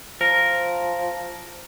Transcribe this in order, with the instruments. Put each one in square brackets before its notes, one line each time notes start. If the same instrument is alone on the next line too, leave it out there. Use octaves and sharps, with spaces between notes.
[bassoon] F3 [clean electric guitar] A#4